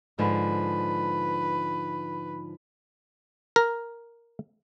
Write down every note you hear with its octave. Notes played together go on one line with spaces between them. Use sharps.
G#2 D3 F3 B4
A#4